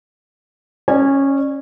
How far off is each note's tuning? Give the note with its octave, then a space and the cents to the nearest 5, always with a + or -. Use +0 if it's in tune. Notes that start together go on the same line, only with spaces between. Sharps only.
C#4 -10 D5 +25 G#5 -20